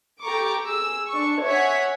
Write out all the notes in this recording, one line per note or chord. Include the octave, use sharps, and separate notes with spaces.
G4 A4 A#5 C#6 D6
G#4 E6
D4 C#6
C#5 E5 F#5 G#5 G#6 B6